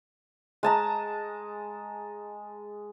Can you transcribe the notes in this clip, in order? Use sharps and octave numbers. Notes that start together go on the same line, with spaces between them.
G#3 A5 A#5